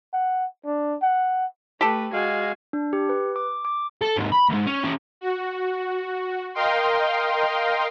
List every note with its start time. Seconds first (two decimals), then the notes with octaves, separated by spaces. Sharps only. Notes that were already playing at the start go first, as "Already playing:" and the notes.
0.13 F#5
0.66 D4
1.03 F#5
1.81 A3 G4 A4 B4
2.13 G#3 F#4 F5 G#5
2.73 D4
2.93 G4
3.09 B4
3.36 D6
3.65 D6
4.01 A4
4.17 D#2 G#2
4.32 B5
4.49 D2 G#2
4.66 C#4
4.84 C#4 G4
5.21 F#4
6.54 A#4 D#5 F5 G5 C6